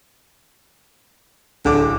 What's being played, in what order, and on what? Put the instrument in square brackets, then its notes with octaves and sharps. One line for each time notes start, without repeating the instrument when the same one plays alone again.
[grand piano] D1 D6 [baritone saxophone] D3